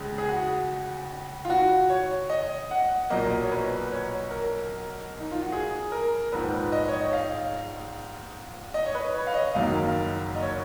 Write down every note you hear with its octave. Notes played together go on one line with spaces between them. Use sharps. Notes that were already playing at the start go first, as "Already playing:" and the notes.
Already playing: C#2 C#3 G#3
G#4
F#4
F4
F#4
C#5
D#5
F#5
B1 A#2 F#3 A#3 D#5
C#5
B4
C#5
A#4
D#4
F4
F#4
G#4
A#4
A#1 G#2 F3 B4
D#5
C#5
D#5
F5
D#5
C#5
B4
C#5
F5
D#5
F#1 F#2 D#3 F#3 A#3 F5
D#5
C#5